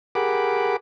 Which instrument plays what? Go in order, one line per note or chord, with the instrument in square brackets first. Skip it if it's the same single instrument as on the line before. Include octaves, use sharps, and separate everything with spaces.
[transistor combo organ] G4 G#4 A#4 F#5 B5 D6